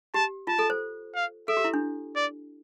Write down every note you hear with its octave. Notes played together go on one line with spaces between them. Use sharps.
G4 A5
F4 A5
A4
C5
F5
A4 E5
G4
E4
D4
D5